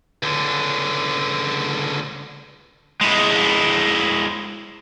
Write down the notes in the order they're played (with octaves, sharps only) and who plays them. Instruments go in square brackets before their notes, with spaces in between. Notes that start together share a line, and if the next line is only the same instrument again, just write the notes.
[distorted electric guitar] C#2 D3
[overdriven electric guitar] G#3 E4